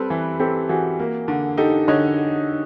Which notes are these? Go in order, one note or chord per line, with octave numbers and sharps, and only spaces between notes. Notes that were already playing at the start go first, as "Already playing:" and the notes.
Already playing: G3 C4 A4 B4
E3
C4 G4 A4
E3 F#4 G#4
A#3
D3
D#4 G4 A4
D3 C#5 D#5